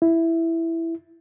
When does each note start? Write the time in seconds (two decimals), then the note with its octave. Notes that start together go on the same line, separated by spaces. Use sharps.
0.02 E4